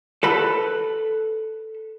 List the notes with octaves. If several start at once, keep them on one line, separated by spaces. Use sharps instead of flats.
A4 B4 B5